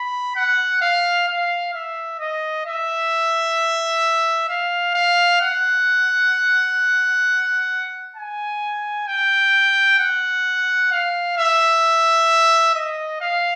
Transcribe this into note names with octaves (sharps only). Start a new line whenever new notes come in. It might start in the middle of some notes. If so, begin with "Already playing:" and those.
Already playing: B5
F#5
F5
F5
E5
D#5
E5
F5
F5
F#5
G#5
G5
F#5
F5
E5
D#5
F5